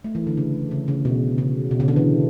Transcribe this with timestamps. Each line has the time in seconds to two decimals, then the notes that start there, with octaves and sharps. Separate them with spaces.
0.04 A3
0.15 E3
0.27 D3
0.37 C#3
0.71 C#3
0.88 C#3
1.05 B2
1.38 C#3
1.71 B2
1.80 C#3
1.88 D3
1.96 E3